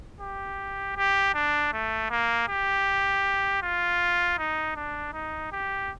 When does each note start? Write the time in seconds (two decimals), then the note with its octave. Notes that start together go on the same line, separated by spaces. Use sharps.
0.21 G4
0.96 G4
1.34 D4
1.73 A3
2.10 A#3
2.48 G4
3.62 F4
4.38 D#4
4.76 D4
5.13 D#4
5.52 G4